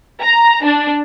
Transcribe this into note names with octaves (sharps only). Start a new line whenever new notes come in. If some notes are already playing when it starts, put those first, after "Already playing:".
A#5
D4